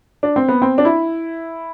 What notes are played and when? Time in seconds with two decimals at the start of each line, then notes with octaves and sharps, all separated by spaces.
0.23 D4
0.36 C4
0.48 B3
0.62 C4
0.78 D4
0.85 E4